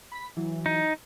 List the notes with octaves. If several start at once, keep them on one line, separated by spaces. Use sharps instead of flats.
B5 B6
E3 F#3
D#4